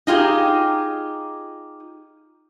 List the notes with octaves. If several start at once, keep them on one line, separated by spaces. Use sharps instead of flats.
D#4 F4 G4 G#4